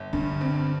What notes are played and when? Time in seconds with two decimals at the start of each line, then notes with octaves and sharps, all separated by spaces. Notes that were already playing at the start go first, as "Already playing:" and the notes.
Already playing: G1
0.13 G2 D3
0.41 C4